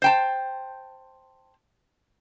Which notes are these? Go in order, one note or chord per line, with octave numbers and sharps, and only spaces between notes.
C5 G5 A5